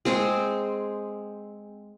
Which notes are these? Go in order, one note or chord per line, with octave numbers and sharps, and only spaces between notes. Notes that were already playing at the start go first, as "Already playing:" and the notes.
G#3 C4 G#4 C5